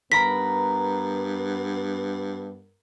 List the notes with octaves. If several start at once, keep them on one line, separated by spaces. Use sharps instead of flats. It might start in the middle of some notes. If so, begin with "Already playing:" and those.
G2 B3 A#4 A#5 B5 B6